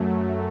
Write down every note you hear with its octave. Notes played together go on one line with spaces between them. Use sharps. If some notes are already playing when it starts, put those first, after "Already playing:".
Already playing: F#2 F#3 A3